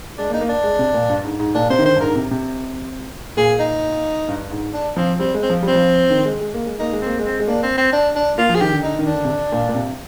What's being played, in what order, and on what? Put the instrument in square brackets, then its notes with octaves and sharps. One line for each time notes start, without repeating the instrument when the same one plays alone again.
[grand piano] G#3 [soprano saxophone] D4
[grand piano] A#3
[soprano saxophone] D#4
[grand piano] A#3
[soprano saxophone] D4
[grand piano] G#3
C3
A#2
G2
G#2
G#2
[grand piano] A#2 [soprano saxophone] D4
[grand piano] C3 [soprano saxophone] C5
[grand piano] D#3
[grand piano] D3 [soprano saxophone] C5
[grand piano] G2
[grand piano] G#2 [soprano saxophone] A#4
[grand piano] C3
C3
[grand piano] A#2 [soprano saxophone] G#4
[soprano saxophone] D#4
[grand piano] G2
G#2
[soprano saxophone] D4
[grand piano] F3 [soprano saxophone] C4
[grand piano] G3 [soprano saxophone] C4
[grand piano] G#3
[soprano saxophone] C4
[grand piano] F3
G3
[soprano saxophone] C4
[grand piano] F3
D#3
G#3
G#3
A#3
G#3
[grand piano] A#3 [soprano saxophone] D#4
[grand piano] G#3
[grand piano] A#3 [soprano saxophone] C4
[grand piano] G#3
[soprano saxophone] C4
[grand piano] G#3
[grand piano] A#3 [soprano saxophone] D4
[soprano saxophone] C4
C4
D4
D4
[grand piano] A#3 [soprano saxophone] F4
[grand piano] F3
[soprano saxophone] G#4
[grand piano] D#3 [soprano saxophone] G4
[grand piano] D3
[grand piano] D3 [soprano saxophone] D#4
[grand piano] D#3
[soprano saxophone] D4
[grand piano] D3
C3
D3
A#2
A#2
C3